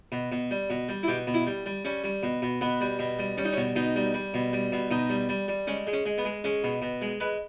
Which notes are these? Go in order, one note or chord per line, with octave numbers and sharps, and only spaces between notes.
B2
B2
G3
B2
G3
E4
B2 G4
B2
E4
G3
G3
G3 C#4
G3
B2
B2
B2 B3
G3
B2
G3
G3 C#4
D#4
C#4
B2
B2 D#4
G3
G3
B2
G3
B2
B2 D#4
G3
G3
G3
G#3 C#4
G#3
C#4
G#3
B3
G#3
G#3 C#4
B2
B2
G#3
G#3 B4